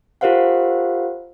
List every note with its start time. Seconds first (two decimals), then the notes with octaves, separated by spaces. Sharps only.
0.21 F4 G4 A#4 C5 F5 F#5